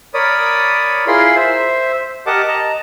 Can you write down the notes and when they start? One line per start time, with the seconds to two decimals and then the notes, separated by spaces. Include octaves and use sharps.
0.14 A#4 C#5 D5 B5 D#6
1.07 E4 F4 G#4 A#4 B5 C6
1.36 C5 E5
2.27 G4 A#4 D#5 F#5 A5 D6
2.48 D#5 A5 A#5